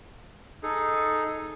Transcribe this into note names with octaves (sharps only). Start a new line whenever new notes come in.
D#4 G#4 A4